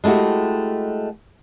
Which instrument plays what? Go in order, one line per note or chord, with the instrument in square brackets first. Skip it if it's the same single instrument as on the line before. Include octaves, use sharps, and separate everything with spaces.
[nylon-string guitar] G#3 A3 E4 F#4 G4